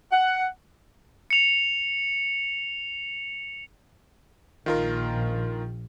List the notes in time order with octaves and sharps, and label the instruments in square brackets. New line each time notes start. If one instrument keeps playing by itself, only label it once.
[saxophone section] F#5
[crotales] C#7 F7
[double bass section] A#1 [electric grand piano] D#3 F4 A#4